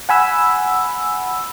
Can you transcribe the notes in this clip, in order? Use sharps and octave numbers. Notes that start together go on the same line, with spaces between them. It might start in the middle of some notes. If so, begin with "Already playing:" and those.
F#5 G#5 B5 E6